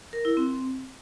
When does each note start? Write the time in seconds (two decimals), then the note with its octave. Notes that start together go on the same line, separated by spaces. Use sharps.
0.13 A#4
0.25 E4
0.37 C4